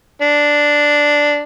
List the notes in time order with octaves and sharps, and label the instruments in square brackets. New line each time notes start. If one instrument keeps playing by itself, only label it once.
[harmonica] D4